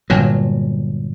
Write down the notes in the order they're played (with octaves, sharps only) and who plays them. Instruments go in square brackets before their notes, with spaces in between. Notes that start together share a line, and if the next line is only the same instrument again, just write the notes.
[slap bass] G1 A#2 F#3